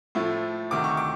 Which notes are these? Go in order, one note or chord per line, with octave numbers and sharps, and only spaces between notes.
A2 F3 A3
D2 C3 D#3 D6
C#6
D6